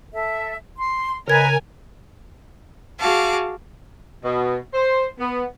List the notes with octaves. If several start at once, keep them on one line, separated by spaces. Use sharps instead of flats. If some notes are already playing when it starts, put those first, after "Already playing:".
A4 E5
C6
C#3 A#4 B4 D#5 G#5 G#6
F#4 G#4 F5 A5 D6
B2
C5
B3